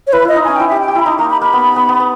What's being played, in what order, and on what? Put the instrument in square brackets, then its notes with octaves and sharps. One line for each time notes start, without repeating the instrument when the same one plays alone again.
[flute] C#5
[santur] E4 [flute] B4
[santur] E4 [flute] D#5
[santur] D#4
[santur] C#4 [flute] G#5
[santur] E4 [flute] G5
[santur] G4 [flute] E5
[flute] G5
[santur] G4
[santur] E4 [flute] B5
[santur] D#4 [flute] A#5
[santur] A#3 [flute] A#5
[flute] B5
[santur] A#3 [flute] B5
[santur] B3
B3
B3
B3